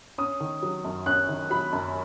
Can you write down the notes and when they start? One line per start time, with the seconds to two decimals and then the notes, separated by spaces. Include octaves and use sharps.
0.18 C#4 D#6
0.40 D#3
0.63 F#3
0.85 F#2
1.06 C#4 F#6
1.29 D#3
1.50 F#3 B5
1.73 F#2